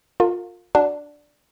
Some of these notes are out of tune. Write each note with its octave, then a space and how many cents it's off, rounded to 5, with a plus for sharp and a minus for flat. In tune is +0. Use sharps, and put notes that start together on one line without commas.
F4 +25 A#4 -40
D4 +0 F#4 +0